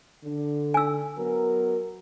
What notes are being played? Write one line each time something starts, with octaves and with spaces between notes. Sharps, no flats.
D3
G#5 E6
F#3 B3 A#4